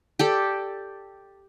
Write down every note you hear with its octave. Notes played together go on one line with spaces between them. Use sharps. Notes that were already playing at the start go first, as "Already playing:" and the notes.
G4 A4 D5